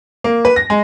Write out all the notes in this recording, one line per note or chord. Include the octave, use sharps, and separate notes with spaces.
A#3
B4
A#6
G#3